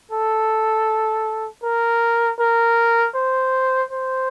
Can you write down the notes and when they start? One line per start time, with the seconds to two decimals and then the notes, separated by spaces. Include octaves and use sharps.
0.11 A4
1.63 A#4
2.39 A#4
3.15 C5
3.91 C5